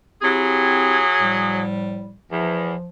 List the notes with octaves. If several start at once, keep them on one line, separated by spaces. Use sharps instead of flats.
F#3 C4 E4 G4 G#4
A2 F3 G3
E2 F3